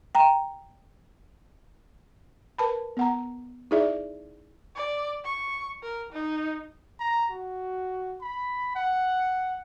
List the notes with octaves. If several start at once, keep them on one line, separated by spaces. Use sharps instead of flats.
G5 A#5
A#4 B4 A5 B5
B3 F#5 A#5
D#4 E4 G#4 D5 E5
D5
C#6
A#4
D#4
A#5
F#4
B5
F#5